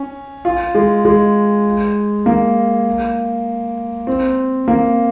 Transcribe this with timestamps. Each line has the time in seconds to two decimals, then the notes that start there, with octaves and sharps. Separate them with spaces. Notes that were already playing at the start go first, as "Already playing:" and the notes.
Already playing: C#4
0.45 F4
0.75 G#3
1.05 G#3
2.26 A#3
4.07 C4
4.68 A#3